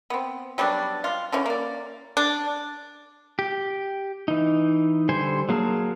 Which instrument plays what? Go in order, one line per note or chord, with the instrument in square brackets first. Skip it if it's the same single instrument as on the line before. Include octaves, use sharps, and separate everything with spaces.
[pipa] B3 C4
F#3 G3 B3 D4
F4
D3 E3 C#4
A#3 D5
D4
[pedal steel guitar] G4
E3 D#4
D3 G3 C5 G#5 C6
F#3 A#3 G#4 A#4 A5